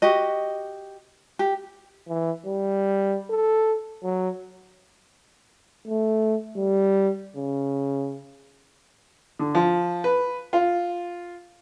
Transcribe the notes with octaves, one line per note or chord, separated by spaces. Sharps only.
F#4 G4 D#5
G4
E3
G3
A4
F#3
A3
G3
C#3
D3
F3
B4
F4